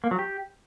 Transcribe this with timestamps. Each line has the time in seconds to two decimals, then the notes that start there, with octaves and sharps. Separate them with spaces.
0.04 A#3
0.11 F#3
0.19 G4